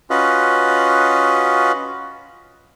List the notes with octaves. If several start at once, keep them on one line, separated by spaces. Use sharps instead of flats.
C#4 F4 F#4 B4 D#5